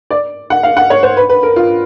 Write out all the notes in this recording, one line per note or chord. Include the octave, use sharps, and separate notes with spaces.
D5
F#5
F5
F#5
C#5
C5
B4
B4
A#4
F4